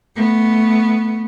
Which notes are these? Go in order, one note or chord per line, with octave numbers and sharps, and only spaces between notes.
A3 B3